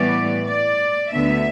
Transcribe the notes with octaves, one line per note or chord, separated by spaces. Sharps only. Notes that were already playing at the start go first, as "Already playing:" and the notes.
Already playing: A2 E3 G3 B3 D5
D5
D2 D3 B3 E5